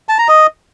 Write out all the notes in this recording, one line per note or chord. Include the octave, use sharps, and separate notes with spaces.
A5
A#5
D#5